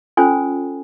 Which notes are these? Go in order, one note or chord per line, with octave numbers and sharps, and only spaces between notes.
C#4 F4 A4 C5 G#5